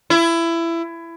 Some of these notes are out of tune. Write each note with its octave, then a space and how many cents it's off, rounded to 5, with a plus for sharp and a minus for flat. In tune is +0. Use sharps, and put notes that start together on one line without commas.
E4 +20